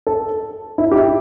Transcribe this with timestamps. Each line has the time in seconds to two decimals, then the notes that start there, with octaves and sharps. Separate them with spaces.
0.07 A4
0.78 E4
0.91 G4
0.96 E4